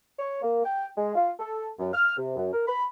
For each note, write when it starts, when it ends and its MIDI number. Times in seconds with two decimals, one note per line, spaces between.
0.18 0.40 73
0.42 0.64 58
0.64 0.88 79
0.97 1.14 56
1.15 1.31 65
1.40 1.68 69
1.79 1.90 42
1.94 2.14 89
2.17 2.36 48
2.36 2.50 42
2.53 2.65 70
2.67 2.85 83